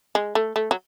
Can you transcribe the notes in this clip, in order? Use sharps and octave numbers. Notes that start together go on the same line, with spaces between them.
G#3
A3
A3
F#3